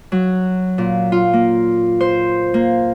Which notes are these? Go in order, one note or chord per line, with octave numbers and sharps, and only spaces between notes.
F#3
A#2
F4
A#3
C5
A#3